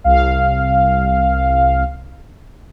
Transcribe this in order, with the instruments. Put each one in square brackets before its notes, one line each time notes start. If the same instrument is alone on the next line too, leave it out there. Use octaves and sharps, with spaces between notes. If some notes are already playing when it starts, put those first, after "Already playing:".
[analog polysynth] C2 F5